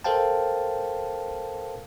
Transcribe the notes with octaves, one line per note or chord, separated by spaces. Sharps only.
A4 A#4 C5 F5 G5 A5